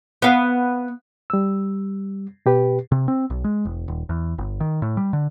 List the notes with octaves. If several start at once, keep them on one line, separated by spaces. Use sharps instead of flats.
B3 F5
G3 E6
B2 G4 B4
C3
C4
B1
G#3
E1
D#1
E2
G1
D#3
A2
G3
D3